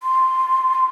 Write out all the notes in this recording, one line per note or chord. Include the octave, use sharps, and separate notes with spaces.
C6